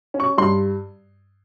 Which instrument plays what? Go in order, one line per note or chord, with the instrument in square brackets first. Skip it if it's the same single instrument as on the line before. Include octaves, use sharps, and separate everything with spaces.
[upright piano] C#4
C#6
G2 C6